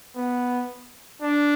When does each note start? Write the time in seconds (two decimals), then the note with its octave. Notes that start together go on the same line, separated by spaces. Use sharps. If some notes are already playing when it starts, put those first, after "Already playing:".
0.17 B3
1.22 D4